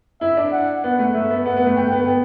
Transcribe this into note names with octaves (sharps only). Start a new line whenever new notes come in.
E4 E5
D4
F#5
B3 F#5
A3
A3 E5
B3
B3 F#5
B3
A3
A3 G5
B3
B3